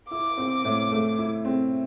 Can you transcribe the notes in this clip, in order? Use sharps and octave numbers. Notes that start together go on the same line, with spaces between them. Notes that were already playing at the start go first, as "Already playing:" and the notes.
E4 D6
C4
A2
A3
E4
C4